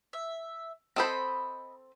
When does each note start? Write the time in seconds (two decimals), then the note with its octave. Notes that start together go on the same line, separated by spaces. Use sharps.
0.13 E5
0.96 C4 A4 C5 D#5 B5